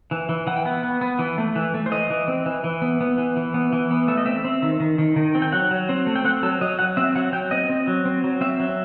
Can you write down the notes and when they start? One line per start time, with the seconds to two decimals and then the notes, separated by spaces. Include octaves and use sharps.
0.11 E3
0.29 E3
0.47 E3 F#5
0.56 G5
0.66 B3 F#5
0.83 B3
1.01 B3
1.19 E3
1.38 A3
1.56 E3
1.74 A3
1.86 C5
1.91 E3 D#5
2.10 E3
2.28 C4
2.46 E3
2.64 E3
2.82 B3
3.01 B3
3.18 E3
3.36 E3
3.54 B3
3.73 E3
3.91 B3
4.08 A3 E5
4.17 D#5
4.26 C4 E5
4.44 C4
4.62 D#3
4.80 D#3
4.98 D#3
5.16 D#3
5.35 C4
5.42 G5
5.52 F#3 F#5
5.71 F#3
5.89 C4
6.07 A3
6.16 G5
6.24 C4 F#5
6.43 F#3 A4
6.61 F#3 D#5
6.79 F#3 F#5
6.97 C4 E5
7.16 F#3 F#5
7.33 F#3 G5
7.51 C4 D#5
7.69 C4
7.87 F#3
8.05 C4
8.24 F#3
8.41 C4 E5
8.60 F#3